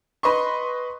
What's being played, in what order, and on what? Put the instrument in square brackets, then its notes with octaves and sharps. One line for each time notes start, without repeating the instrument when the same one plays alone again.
[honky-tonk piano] B4 D#5 C6 C#6